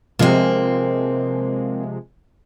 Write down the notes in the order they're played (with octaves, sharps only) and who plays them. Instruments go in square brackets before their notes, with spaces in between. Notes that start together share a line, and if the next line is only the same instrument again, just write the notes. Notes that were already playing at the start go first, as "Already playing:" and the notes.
[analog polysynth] C3 F3 G#3 [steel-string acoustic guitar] A#3 C4